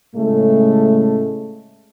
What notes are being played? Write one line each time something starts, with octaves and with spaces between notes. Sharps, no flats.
A2 C#3 G#3 A3